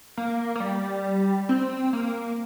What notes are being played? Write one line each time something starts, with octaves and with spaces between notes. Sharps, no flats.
A#3
A#3
G3
C4
A#3